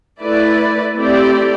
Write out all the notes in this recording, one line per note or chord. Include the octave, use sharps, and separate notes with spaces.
A3 E4 B4 D5
A3 C4 E4 G4 D5